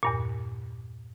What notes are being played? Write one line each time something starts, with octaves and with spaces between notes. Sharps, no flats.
E2 G2 A#2